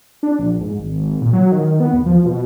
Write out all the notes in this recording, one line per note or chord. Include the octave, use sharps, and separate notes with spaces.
D4
A#1
G#2
G#1
A#2
F#3
D#3
B3
D#2
F3
B2